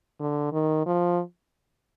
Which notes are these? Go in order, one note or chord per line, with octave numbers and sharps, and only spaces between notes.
D3
D#3
F3